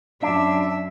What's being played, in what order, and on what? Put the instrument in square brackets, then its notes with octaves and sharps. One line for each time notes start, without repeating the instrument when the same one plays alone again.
[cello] F#2 E5 [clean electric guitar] D4